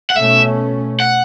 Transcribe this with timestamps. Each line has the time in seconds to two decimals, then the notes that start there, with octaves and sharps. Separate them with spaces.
0.10 F#5
0.16 B2 A3 C#4 E5
1.00 F#5